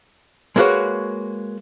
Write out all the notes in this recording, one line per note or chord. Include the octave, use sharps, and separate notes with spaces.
G#3 A#3 B3 F#4 B4 C#5